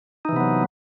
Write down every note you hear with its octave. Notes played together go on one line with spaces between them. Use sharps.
C3 E3 F#3 B3 D#4